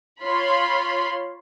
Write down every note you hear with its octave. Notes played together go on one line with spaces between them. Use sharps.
F4 C#5 B5 C6